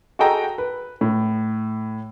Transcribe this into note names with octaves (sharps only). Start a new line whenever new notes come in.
F#4 G#4 A4 D#5 G5 A#5
B4
A2